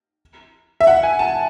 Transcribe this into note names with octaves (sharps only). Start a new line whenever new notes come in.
E5
F#5
G#5
A5